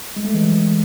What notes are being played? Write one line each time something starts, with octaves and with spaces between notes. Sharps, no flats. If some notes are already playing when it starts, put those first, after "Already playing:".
G#3
A3
E3 G#3
F#3